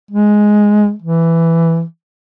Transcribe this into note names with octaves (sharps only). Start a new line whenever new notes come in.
G#3
E3